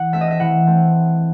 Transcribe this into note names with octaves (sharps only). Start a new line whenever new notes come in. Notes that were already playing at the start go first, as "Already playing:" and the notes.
Already playing: E3 F#5
A3 C4 E5
D#5
E5
E3 F#5
A3 C4